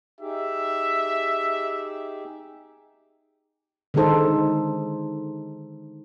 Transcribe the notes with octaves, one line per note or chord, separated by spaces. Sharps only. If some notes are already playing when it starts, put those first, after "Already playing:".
D#4 G4 G#4 E5
D3 D#3 G#3 D#4 A4 C5